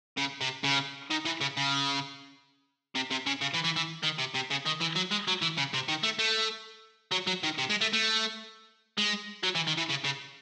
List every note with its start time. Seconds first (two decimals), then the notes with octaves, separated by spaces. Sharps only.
0.17 C#3
0.41 C3
0.64 C#3
1.10 D#3
1.25 E3
1.41 C#3
1.57 C#3
2.95 C3
3.11 C3
3.27 C#3
3.41 C#3
3.54 E3
3.64 E3
3.76 E3
4.03 D#3
4.18 C3
4.34 C3
4.50 C#3
4.66 D#3
4.80 E3
4.95 F#3
5.11 G#3
5.28 F#3
5.42 E3
5.58 C#3
5.74 C3
5.89 D#3
6.03 A3
6.19 A3
7.11 F#3
7.27 F#3
7.43 D#3
7.58 C3
7.70 G#3
7.81 A3
7.93 A3
8.98 G#3
9.43 F#3
9.55 E3
9.67 D#3
9.78 E3
9.90 C#3
10.05 C#3